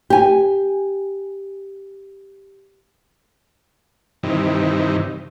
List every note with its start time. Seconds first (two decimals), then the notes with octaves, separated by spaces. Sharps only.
0.10 G4 G#5
4.23 G2 C3 D#3 E3